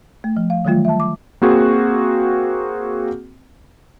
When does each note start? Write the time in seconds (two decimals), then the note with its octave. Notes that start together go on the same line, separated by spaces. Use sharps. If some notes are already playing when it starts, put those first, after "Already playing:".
0.24 A3
0.37 F3
0.50 F5
0.65 D#3 E3 F#3 G3 A3 F4
0.85 E5 A5
1.00 D6
1.42 A#3 C4 F#4 G#4